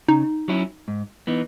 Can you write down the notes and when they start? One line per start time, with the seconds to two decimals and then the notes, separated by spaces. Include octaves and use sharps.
0.08 C#3 D#4
0.48 F#3 C#4 E4
0.88 G#2
1.27 E3 B3 D#4